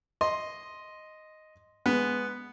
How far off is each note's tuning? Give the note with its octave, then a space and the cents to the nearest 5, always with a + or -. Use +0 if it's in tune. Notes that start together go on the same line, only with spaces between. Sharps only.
D#5 +0 C6 +0
G#3 +0 B3 +0